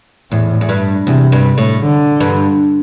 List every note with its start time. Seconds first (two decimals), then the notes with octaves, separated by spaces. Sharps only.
0.31 E2 A2
0.61 E2
0.69 G2
1.07 E2 C3
1.32 G2
1.58 A2
1.83 D3
2.20 G2